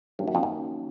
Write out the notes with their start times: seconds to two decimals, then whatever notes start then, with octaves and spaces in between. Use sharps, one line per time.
0.19 G2 D#3 F#3 A#3 C#4 F#4
0.28 F#2
0.35 F2
0.43 F#2